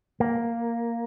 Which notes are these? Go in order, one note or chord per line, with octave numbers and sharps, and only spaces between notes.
A#3